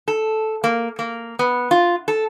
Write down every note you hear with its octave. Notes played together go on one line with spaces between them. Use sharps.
A4
A#3
A#3
B3
F4
A4